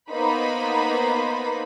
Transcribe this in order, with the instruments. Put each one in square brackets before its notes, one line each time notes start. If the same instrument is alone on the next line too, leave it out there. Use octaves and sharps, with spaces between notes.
[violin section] A#3 B3 D#4 C5 B5